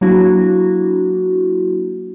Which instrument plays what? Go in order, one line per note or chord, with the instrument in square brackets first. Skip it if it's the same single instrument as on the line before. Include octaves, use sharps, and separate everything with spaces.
[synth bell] F#3 A#3 D4 E4 F#4